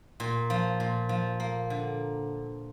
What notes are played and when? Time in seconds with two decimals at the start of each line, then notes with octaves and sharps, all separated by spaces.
0.20 A#2
0.50 F3
0.80 A#2
1.09 F3
1.40 A#3
1.70 D3